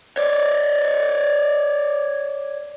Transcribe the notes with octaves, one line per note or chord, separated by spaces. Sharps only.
C#5 D5